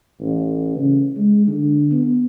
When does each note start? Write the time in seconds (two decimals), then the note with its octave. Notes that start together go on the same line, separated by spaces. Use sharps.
0.20 A1
0.76 C#3
1.17 G#3
1.47 D3
1.91 B3